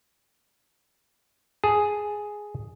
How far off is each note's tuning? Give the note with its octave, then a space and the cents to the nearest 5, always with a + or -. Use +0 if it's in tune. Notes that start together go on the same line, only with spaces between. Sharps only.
G#4 +0 A5 +0